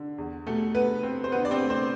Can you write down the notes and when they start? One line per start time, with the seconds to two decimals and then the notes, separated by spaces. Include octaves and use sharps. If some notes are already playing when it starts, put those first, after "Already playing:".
Already playing: D3
0.18 E2
0.47 B2 A3 A4
0.75 A3 B3 B4
1.03 C4
1.24 C5
1.32 D3 B3 B4
1.45 D5
1.51 C4 C5
1.61 A3
1.70 C4 C5